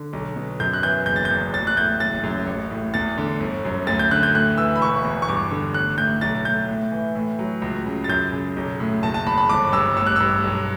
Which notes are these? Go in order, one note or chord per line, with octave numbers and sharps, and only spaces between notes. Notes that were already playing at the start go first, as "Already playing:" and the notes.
Already playing: D3
B1
B2
F#2 G6
F#6
E3 G6
F#1 G6
A6
G6
E2
A1 A6
F#6
A2 G6
F#1 A6
F#2
A1
A2
E2 A6
D3
G1
F#2
D2 A6
G6
D3 F#6
G6
A2 F#6
E3 E6
B5
E1 C#6
E2
C#6
G2 D6
D3
A1 F#6
A2 G6
B1 A6
A2 G6
A2
E3
A2
F#3
C#2
C#3
A6
F#2 G6
C#3
B1
A2
F#1 A5
A5
E2 B5
B5
G1 D6
G2 E6
A1 E6
F#6
G2 E6
B1